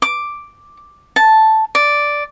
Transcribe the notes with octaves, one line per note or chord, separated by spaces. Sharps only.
D6
A5
D5